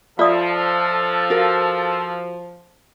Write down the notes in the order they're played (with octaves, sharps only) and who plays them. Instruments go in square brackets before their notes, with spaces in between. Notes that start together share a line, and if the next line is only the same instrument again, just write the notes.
[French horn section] F3 [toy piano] F4 D5 D#6 [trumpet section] A4 [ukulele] E5
[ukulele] F#4 A#4 F5